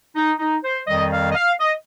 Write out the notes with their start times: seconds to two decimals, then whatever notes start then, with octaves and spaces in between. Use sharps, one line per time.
0.16 D#4
0.39 D#4
0.64 C5
0.87 F2 D#3 G3 D#5
1.11 F5
1.30 D#5
1.35 F5
1.60 D#5